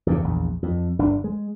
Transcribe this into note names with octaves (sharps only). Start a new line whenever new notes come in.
E2 G2 C#3
A#1 E2
F2
G1 D4
G#3